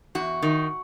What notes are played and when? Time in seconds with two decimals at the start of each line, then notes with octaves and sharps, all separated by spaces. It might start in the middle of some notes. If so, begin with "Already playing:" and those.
0.15 E2 F#4
0.43 D#3